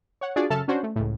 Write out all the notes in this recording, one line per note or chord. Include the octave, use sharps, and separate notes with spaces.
C#5 F#5
D4 F4 F#4 G#4 D5
F#2 C#3 A4 E5 A5 F6
C#4 D4 F#4 C5
A3
C#2 A2